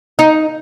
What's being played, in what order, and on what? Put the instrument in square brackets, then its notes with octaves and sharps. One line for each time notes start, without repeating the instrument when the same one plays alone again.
[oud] D#4